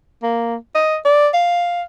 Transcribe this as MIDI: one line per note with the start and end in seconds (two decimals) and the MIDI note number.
0.23 0.56 58
0.75 0.97 75
1.05 1.29 74
1.34 1.83 77